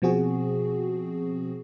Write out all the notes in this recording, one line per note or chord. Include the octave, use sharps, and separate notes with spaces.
B2 F3 C4 F#4 G#4